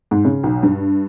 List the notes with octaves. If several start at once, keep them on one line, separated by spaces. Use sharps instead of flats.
G#2
C#3
B1
G2